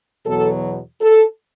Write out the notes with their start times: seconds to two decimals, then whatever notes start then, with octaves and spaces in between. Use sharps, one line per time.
0.25 E2 B2 F#3 A4
1.01 A4